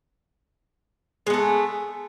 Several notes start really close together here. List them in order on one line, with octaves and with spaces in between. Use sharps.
G#3 B3 A3